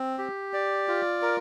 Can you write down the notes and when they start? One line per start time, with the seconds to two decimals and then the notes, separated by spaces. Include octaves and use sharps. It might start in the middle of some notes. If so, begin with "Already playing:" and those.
Already playing: C4
0.18 G4
0.53 D5
0.88 F4
1.22 A#4